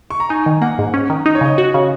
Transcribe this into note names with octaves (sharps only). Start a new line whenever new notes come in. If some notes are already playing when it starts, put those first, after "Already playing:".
C#6
A#5
D#4 G#5
D#3
A#3 F#5
G#2
C#4
D#3
D#4 D#5
C#5
C#3 D#5
F#4
C#3